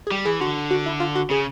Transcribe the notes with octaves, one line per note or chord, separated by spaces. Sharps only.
G#4
G3 G4
E3 G#4
D3 F#4
F#4
E4
F4
F#4
C#3 G#4